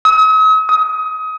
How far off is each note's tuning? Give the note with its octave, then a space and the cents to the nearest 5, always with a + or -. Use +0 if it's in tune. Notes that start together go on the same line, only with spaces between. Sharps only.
D#6 +45
D#6 +25